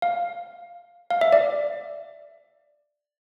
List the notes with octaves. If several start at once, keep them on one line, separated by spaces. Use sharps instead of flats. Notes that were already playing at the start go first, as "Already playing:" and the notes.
F5
F5
E5
D5